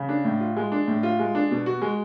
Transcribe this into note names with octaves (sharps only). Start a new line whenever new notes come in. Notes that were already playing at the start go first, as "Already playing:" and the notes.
Already playing: C#3
D4
A2
F4
G#3
D4
A2
F4
G#3
D4
B2
F#4
G#3